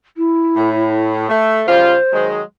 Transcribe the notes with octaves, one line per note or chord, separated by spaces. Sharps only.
E4
A2
A3
C#3 G3 F4 C5
D#3 F#3 G#3